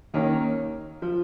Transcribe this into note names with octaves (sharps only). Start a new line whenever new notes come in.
D#2 D#3 A#3 C#4
F3